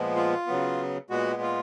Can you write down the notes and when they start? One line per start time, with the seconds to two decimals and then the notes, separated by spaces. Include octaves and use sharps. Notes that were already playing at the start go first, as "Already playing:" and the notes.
Already playing: A#2 F3 G#3 B3
0.16 F4
0.47 C#3 F#3 B3
1.10 A#2 G#3 B3 F#4
1.42 F4